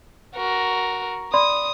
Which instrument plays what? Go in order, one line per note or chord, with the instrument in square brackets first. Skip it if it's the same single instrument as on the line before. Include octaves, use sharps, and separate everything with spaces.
[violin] F#4 A#4
[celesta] D5 B5 C6 [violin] D#6